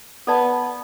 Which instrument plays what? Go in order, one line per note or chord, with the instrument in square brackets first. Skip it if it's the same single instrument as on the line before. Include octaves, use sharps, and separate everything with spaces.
[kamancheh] B3 [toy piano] A4 D5 A5